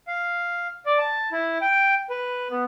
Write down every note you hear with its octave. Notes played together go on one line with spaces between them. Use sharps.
F5
D5
A5
E4
G5
B4
B3